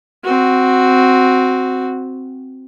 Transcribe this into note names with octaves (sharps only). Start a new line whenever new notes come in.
C4 F#4